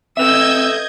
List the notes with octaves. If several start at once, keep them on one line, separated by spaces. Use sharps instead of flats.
C4 A4 B4 D#5 E5 E6 G6 G#6